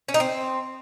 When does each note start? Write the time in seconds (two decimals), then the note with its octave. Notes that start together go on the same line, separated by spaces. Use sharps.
0.08 C#4
0.14 D#4
0.20 C4